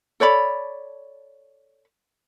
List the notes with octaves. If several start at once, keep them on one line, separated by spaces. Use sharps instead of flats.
A4 C#5 D5 B5